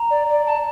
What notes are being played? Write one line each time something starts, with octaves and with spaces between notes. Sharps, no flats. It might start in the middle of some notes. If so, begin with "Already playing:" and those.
Already playing: A#5
D5
D5
A5